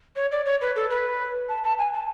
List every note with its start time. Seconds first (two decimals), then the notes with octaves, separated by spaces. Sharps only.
0.15 C#5
0.31 D5
0.45 C#5
0.61 B4
0.75 A4
0.89 B4
1.48 A5
1.63 A5
1.78 G#5
1.93 A5